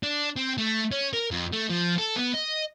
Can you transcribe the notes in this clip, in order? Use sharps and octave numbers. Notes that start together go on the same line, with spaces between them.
D4
C4
A3
C#4
A#4
F2
A3
F3
A4
B3
D#5